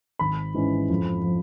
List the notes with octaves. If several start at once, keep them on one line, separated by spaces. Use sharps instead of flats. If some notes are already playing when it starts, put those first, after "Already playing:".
G#1 B5
G#2 E3 G#3 C#4
F2
F3